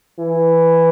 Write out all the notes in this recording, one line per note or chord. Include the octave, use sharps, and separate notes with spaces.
E3